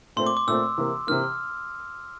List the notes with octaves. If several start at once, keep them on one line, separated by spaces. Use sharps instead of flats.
A#2 A3 C4 C6
D6
D6
A#2 A3 C4 E6
C3 E3 A#3
C3 E3 A#3 F6